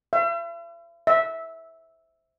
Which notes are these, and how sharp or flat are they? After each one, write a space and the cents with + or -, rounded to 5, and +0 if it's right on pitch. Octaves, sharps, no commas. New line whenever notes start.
E5 +45
E5 -10